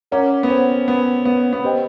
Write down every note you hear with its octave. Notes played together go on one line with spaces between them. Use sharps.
C#4 A#4 C#5 F#5 A#5 D6
B3
C4
B3
B3
B3
C4 G4 B4 D#5 G5